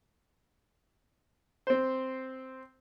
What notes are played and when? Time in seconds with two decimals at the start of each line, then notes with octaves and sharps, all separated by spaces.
1.67 C4 C5